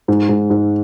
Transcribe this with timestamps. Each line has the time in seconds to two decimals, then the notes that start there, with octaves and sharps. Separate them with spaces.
0.08 G#2
0.29 G#2
0.50 G#2